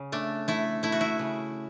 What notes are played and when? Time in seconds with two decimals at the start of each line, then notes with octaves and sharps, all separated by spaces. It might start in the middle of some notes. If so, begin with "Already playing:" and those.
Already playing: C#3
0.12 A3 D4
0.48 A3 E4
0.83 A3 E4
0.92 F#4
1.01 E4
1.19 C#3